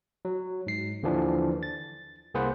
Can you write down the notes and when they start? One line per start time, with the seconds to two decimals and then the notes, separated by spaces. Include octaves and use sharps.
0.25 F#3
0.66 G#2 C7
1.03 D#2 D3 E3 F3 D4
1.63 A6
2.34 C2 A#3 G#4 B4 C5 F#5